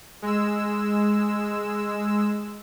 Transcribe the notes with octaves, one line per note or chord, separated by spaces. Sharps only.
G#3 E6